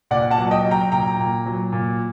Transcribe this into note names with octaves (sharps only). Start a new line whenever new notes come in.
A#2 D5 F#5
F#5 A5
F#3
D#5 G5
F#3
G5 A#5
A#2 G5 A#5
A#2
F#3
A#2